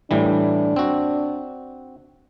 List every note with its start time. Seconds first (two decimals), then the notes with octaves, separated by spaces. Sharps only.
0.11 A2 E3 G3 D4
0.76 C4 F#4